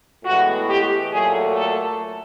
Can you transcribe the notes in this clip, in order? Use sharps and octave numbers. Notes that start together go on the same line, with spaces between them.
A2 E3 G#3 B3 F#4
G4
A#2 F#3 A3 G#4
A4